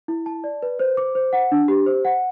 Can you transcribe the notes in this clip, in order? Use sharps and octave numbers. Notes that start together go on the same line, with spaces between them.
E4
A5
D5
B4
C5
D6
C5
F#5
D4
G4
C5
F#5